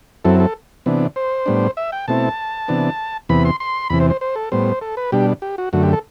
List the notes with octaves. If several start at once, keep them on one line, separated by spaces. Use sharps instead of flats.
F#2 F#3 C4 E4 A4
A4
C3 E3 B3 D4
C5
A2 G3 B3 D4
E5
G5
B2 A3 C4 E4 A5
C3 E3 B3 D4
E2 C3 E3 B3 B5
C6
C6
E2 C3 E3 B5
C5
C5
C5
A4
A2 G3 B3 C5
A4
B4
B2 G3 D4 G4
G4
F#4
F#2 D3 A3 F#4
G4
A4